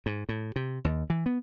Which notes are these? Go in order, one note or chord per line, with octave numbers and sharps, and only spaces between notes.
G#2
A2
C3
D#2
E3
B3